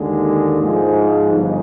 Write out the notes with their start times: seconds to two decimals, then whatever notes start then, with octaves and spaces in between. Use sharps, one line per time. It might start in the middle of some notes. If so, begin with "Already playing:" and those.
Already playing: D#2 D3 G#3
0.60 G#2 F3 G#3
1.32 G1